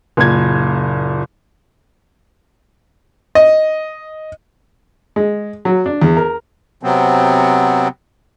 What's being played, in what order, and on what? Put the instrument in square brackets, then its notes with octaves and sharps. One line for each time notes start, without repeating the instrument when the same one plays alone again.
[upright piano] F#1 A#2 G#6
[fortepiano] D#5
G#3
F#3
D4
E2
A#4
[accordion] C3 F#3 B3 C4